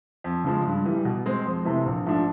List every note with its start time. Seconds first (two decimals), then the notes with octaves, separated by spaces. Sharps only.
0.24 F2
0.44 C#3 F3 G#3
0.65 G2
0.86 E3 G3
1.05 B2
1.26 G#3 C4
1.46 F2
1.65 C3 E3 A3 C4
1.86 A#1
2.06 G#2 F3 A3 D4